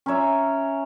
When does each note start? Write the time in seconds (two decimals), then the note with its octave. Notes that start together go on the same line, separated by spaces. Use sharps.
0.06 C#4 A#4 C#5 E5